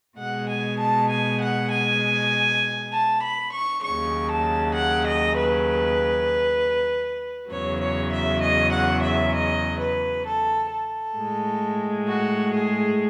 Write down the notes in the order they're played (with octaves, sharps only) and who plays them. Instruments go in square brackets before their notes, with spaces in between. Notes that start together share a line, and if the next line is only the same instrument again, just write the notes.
[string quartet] B2 G#3 F#5
G#5
A5
G#5
F#5
G#5
A5
B5
C#6
D#2 C#3 F#3 C#6
A5
F#5
D#5
B4
E2 C#3 F#3 C#5
C#5
E5
D#5
F#5
E5
D#5
B4
A4
A4
A2 G#3
F#4
G#4